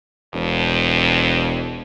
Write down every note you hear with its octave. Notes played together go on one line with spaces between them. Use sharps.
E1 F2